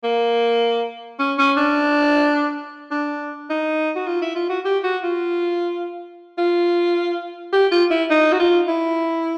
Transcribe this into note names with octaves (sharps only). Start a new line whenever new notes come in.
A#3
C#4
C#4
D4
D4
D#4
F#4
F4
E4
F4
F#4
G4
F#4
F4
F4
G4
F4
E4
D#4
F#4
F4
E4